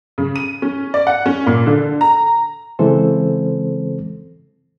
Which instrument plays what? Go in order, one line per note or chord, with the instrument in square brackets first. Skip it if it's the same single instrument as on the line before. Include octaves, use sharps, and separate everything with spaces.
[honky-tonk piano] C#3
D#7
C#4
D5
F#5
C#4
A#2
D3
A#5
[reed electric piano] C#3 E3 G#3 C4 A4 C5